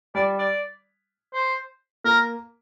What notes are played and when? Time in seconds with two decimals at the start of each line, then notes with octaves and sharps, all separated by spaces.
0.15 G3 D5
0.39 D5
1.33 C5
2.04 A#3 A#4